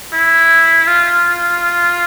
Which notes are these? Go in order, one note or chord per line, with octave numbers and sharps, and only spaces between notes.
E4
F4